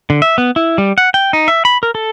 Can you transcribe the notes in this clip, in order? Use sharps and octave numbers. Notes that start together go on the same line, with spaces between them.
D3
E5
B3
E4
G3
F#5
G5
D#4
E5
B5
A#4
A4